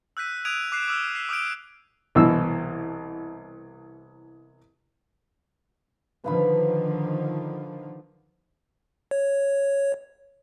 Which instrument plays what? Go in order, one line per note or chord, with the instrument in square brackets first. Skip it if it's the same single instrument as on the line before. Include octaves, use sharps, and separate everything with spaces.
[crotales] E6 F#6 G6 B6 D#7
D#6 F#6 G#6 D7 D#7 F7
D6 F#6 C7 E7
D6 E6 F6
B6 C7
D6 D#6 F6 G6 D7
[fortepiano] C2 B2 E3 E6
[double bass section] D3 D#3 F3 [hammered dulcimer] B4 F5 B5
[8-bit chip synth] C#5